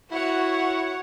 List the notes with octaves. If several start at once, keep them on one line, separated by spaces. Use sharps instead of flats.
E4 F#4 C#5 F#5